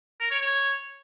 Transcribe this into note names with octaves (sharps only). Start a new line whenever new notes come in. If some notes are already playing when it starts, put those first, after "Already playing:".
A#4
C#5
C#5